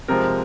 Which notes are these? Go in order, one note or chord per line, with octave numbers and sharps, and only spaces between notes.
C3 F3 G#3 A#4